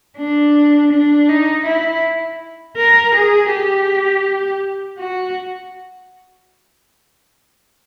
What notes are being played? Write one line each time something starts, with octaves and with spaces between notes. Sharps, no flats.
D4
D4
D#4
E4
A#4
G#4
G4
F#4